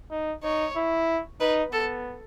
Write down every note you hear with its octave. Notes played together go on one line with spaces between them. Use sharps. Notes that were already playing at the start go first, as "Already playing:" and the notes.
D#4
D#4 C#5
E4
D#4 B4
B3 A4